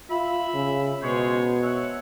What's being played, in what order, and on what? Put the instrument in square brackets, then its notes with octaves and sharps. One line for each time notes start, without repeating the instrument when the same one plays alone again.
[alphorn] F4 [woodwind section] E5 B5
[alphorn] C#3
[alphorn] B2 [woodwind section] G#3 C5 C#5
[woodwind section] C#5 E5 F#5